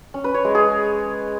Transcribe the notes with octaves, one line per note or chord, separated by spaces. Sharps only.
C#4
B4
C#5
G#3
G#4